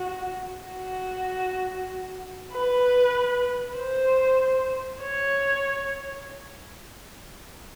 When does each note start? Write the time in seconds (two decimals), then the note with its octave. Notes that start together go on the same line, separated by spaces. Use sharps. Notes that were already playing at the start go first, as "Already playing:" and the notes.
Already playing: F#4
0.65 F#4
2.52 B4
3.77 C5
5.01 C#5